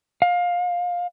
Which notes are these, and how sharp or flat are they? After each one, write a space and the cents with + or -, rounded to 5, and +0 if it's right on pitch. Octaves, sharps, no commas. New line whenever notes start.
F5 +20